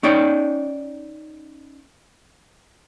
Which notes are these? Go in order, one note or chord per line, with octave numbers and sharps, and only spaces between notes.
C#4 D#4 D5 G5